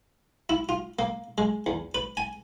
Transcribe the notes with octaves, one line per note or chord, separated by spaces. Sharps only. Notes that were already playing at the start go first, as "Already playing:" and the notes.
E4
F4
A#3
G#3
E2
B4
G#5